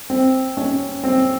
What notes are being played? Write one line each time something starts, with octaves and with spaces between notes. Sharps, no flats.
C4
C#4
C4